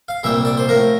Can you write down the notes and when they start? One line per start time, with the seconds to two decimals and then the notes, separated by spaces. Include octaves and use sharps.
0.08 F5
0.23 C2 A#2 G3 E5
0.45 D5
0.57 C5
0.69 A2 F3 A#4